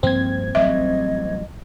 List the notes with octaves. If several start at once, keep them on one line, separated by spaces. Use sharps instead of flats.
G2 F3 A#3 C4 G#6
A1 F#3 G3 D#5 E5